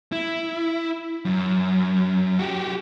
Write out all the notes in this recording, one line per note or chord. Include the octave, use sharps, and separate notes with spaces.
E4
F#2
F#4 G4